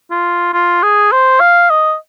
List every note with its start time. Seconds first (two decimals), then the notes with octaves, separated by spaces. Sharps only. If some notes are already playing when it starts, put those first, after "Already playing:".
0.11 F4
0.53 F4
0.83 G#4
1.11 C5
1.40 F5
1.70 D#5